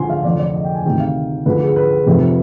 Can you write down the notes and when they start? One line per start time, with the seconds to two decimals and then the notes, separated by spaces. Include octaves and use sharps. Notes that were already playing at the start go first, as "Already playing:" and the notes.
Already playing: D2 D3 F3 G#5 C6
0.10 F5
0.24 F1 F2 D3 D5
0.39 D5
0.54 D#5
0.65 G5
0.75 G#5
0.85 D2 C3 D#3 G5
1.00 F5
1.46 D2 D3 F3 B4
1.61 G#4
1.76 B4
2.07 F1 F2 C3 F3